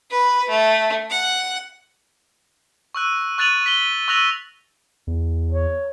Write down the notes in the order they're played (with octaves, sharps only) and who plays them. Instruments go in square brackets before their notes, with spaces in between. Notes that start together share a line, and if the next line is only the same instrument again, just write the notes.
[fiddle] B4
A3
F#5
[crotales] C#6 E6 F#6
C#6 F#6 A6 D#7 F7 F#7
B6 F#7 G7
C#6 E6 F#6 A#6 F7 F#7
[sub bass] E2
[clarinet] C#5